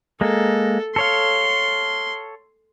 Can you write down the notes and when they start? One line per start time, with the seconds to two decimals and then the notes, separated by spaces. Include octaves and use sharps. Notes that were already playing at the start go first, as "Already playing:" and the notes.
0.21 G#3 A#3 A4
0.96 A4 C#5 F5 C6